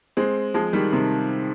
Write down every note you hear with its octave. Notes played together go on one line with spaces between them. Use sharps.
G#3 C4
F3 G#3
D#3 G3
C3 D#3